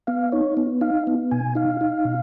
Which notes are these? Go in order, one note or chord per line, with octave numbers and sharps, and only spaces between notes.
B3 F5
D#4 C#5
B3
D#4 F5
B3
B2 G#5
D#4 F5
D#4
B2